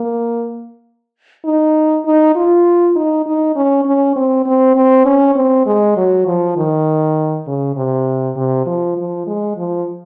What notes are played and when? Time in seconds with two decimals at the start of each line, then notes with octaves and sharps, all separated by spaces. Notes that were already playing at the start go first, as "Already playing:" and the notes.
Already playing: A#3
1.45 D#4
2.06 D#4
2.36 F4
2.96 D#4
3.26 D#4
3.56 C#4
3.85 C#4
4.16 C4
4.46 C4
4.76 C4
5.06 C#4
5.35 C4
5.66 G#3
5.96 F#3
6.27 F3
6.57 D#3
7.47 C#3
7.76 C3
8.36 C3
8.66 F3
8.97 F3
9.27 G#3
9.56 F3